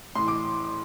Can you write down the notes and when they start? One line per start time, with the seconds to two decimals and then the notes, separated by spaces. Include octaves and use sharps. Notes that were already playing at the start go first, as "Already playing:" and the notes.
0.15 A2 E3 C6
0.28 D6